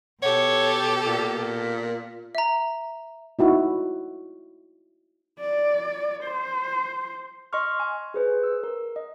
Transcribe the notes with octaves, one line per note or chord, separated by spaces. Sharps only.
B2 G4 A4 C#5
A#2
E5 A#5
D#4 E4 F#4
D5
C5
D#5 C6 C#6 F6
G#5
G#4 B4 C5
E6
A#4
D#5